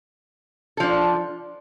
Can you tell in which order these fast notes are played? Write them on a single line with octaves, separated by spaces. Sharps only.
A4 F3 D4